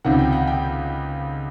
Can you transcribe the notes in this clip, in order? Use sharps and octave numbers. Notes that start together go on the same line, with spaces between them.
C#2 C3 D#3 F#5
G5
F#5
G5